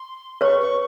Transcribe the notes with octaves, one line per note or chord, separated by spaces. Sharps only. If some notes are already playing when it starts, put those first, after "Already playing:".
Already playing: C6
B4 C#5 C#6
C#6